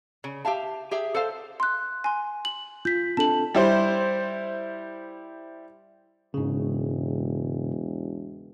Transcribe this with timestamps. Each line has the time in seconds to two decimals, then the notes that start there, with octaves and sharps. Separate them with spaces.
0.24 C#3
0.45 G4 E5 F5 A5
0.91 G4 G#4 E5
1.14 A4 C5 F5
1.60 C6 F#6
2.04 G#5 C6
2.45 F#7
2.85 F4 G6 B6
3.17 C4 D4 A4 A5 F#7
3.55 G3 E4 C5
6.34 E1 G#2 C#3